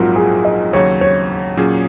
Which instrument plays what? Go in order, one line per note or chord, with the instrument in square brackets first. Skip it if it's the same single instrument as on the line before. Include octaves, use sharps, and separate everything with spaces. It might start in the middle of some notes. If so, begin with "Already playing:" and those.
Already playing: [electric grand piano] A#1 G#2 F#3 C4 [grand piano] F4 F#4 A#4
[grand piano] G#4
D#5
[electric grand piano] D#2 C#3 F#3 [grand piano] C#5
[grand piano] C#5
[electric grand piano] A#2 F#3 C#4 G#4